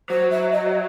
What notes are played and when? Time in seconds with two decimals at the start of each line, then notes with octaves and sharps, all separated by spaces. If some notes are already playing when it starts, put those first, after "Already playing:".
0.10 F#3 C5
0.31 E5
0.52 D#5